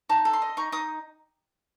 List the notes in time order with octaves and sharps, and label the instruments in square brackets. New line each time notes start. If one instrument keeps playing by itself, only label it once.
[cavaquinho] D#4 A5
A4
C6
D#5
D#4 C#6
D#4 D#6